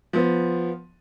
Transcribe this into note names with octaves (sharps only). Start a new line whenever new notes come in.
F3 B3